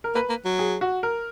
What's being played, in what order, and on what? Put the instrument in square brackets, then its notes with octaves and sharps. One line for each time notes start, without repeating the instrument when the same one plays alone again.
[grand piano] A#4
[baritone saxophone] A#3 [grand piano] B4
[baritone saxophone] A#3
F#3
[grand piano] G#4
F#4
A#4